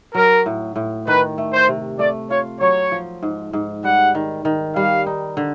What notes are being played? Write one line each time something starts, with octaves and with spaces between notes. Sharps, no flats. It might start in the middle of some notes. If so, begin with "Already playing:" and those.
F#3 A#4
A2
A2
D#3 B4
A3
C5
C3
A3 D5
F4 C#5
F#3 C#5
F3
G#2
G#2
G3 F#5
D#3
D#3
G3 F5
D#4
D3